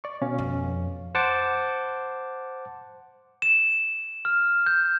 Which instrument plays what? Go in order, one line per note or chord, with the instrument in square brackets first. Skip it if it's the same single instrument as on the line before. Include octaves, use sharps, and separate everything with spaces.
[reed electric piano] D5 C#6
B2 C#4 F5
[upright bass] F2
[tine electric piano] C5 F#5 A5 D6
[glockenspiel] E7
F6
G6